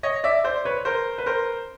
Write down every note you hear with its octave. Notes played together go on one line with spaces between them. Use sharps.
C#5 D#5
D5 E5
C5 D5
B4 C#5
A#4 C5
B4
A#4 C5